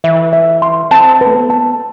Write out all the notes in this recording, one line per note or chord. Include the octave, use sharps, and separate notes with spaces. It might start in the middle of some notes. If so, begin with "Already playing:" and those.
E3 E5
E5
C6
C4 A5
B4
A3
B3
A5